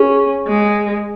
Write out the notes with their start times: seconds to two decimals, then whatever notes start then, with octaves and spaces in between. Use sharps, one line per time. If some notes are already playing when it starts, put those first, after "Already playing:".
Already playing: C#4 G#4
0.48 G#3